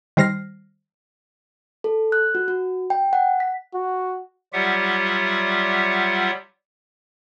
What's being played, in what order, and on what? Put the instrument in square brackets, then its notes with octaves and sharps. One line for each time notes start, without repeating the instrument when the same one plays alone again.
[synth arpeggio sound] D#3 G3 C5 F6 A#6 C7
[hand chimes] A4
F#6
F#4
F#4
G5
F#5
B6
[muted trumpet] F#4
[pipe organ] F#3 G3 F4 G4 E5 F#5